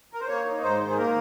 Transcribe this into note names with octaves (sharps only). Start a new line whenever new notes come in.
A#4
C5
A#3 C#5
D#4
G#2 C5
D#3
G#4
A#3 A#4